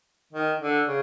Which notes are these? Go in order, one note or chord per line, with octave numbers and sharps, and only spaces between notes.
D#3
D3
C#3